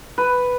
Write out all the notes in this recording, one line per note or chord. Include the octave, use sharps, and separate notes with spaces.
B4